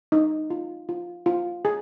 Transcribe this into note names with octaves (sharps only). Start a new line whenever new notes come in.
D#4
F4
F4
F4
G#4